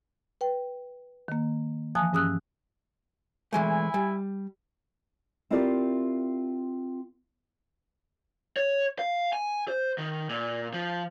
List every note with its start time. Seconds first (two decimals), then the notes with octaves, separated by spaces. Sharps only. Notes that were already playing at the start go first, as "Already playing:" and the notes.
0.41 B4 G5
1.28 D#3 A#3
1.95 E3 F3 G#5 A5 D#6 F#6
2.13 G2 C#4 G#4 D#6 E6 F#6
3.53 E3 G#3 A3 E4 G#5
3.94 G3
5.50 C4 E4 F4 G4 A#4 D5
8.56 C#5
8.99 F5
9.33 G#5
9.68 C5
9.98 D#3
10.29 A#2
10.73 F3